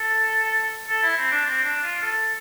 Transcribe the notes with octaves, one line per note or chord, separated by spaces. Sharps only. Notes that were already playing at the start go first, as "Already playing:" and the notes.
Already playing: A4
A4
E4
C4
D4
C4
D4
F4
A4